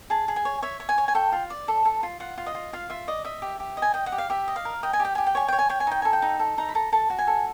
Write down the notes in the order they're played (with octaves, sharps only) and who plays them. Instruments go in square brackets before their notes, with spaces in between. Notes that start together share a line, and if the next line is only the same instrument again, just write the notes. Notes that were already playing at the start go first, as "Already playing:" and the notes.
[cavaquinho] G#4 A5
G#4
G#5
C#5
C#5 E5
C#5
G#5
C#5
G#5
A4 G5
F4
D5
A4
A4
F4
F4 F#5
F4
D#5
F4
F4 F5
F4 E5
D5 D#5
D#5 E5
G4
G4
D#5
G#5
D#5 G5
F#5
G4
F5
G4 E5
D#5
F5
A#4
D#5 G5
G#5
G4
G5
G4 G#5
G5
C#5 G#5
C#5 G5
G#5
C#5 G5
G#5
D#4 G5
A4 G#5
G5
D#4
A4
D#4 A#5
B5
A4 A#5
A4 A5
F#4
G#5
A4